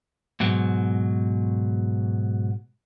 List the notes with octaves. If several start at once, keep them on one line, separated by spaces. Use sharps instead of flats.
G#2 B2 F#3